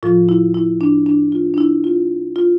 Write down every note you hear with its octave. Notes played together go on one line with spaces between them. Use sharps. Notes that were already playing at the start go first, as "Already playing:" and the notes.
A2 F3 F4
E4
E4
D4
D4
F4
D4
E4
F4
F4